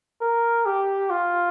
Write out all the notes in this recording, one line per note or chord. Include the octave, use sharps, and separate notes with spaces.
A#4
G4
F4